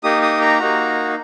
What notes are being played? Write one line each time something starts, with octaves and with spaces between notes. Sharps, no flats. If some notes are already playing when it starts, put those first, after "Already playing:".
A#3 D#4 G4 D#6
D#6
A#5
A#3 D#4 F#4